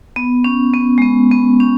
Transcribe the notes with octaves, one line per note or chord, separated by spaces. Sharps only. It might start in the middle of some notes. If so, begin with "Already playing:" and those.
B3
C#4
B3
G#3
B3
B3
C#4